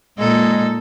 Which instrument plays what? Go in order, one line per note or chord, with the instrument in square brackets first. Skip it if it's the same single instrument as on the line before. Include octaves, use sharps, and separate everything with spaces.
[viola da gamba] A#2 D#4 A4 [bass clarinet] G#3